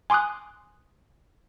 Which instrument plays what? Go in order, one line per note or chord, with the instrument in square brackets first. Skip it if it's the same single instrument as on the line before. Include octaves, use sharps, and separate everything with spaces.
[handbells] G#5 C6 D6 D#6 F#6